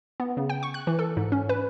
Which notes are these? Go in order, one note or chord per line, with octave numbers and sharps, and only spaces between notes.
B3
C#3
G5
C#6
F#6
E3
A4
G#2
C#4
B4